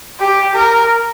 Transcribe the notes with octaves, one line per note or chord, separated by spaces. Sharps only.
G4
A#4